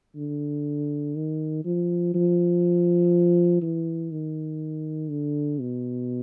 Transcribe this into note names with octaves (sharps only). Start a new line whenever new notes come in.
D3
D#3
F3
F3
E3
D#3
D3
B2